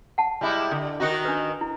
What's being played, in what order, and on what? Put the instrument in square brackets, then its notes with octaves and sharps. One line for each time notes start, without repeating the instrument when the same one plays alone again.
[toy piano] F#5 A5
[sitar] G3 G#3 E4
D3
D#3 D#4 F#4
[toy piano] D4 B4
E4